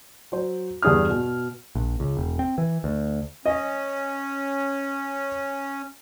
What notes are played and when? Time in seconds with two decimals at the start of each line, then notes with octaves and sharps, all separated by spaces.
0.32 F#3 C5
0.82 E2 G2 G#4 D#6 F6
1.09 B2
1.75 A#1
2.00 C#2
2.17 E1
2.39 C4
2.58 E3
2.84 D2
3.46 C#4 D#5